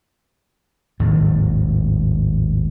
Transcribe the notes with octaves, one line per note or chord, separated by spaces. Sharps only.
G#1 D#2 A2